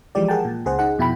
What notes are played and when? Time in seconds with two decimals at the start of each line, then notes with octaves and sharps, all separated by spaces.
0.15 E3 F3 G#3 G4 D5
0.28 G#4 A#4 F#5 G5 A5
0.45 A#2
0.65 C#2 C#3 G#4 C5 F#5
0.79 D#4 G#4 F#5
0.98 F2 B2 E4 G5 B5